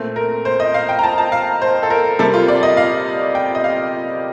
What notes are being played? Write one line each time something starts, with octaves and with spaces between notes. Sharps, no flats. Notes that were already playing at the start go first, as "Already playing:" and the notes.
Already playing: A#2 A3 C4
A#4
C5
D#5
F5
G5
A#5
A5
A5
F5
C5
A4
A#4
C3 G3 A#3 A4
F4
D5
D#5
F5
G5
D#5
F5